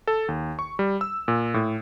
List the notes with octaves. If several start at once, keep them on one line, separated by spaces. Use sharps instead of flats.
A4
D#2
C#6
G3
E6
A#2
A2